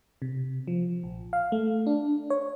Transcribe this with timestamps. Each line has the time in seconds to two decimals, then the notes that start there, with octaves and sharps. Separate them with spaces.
0.22 C3
0.67 F3
1.03 A#1
1.33 F5
1.52 A3
1.87 D4
2.30 C#5